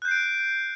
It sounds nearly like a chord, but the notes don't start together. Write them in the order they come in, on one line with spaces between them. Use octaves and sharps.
F#6 G6 C7 D7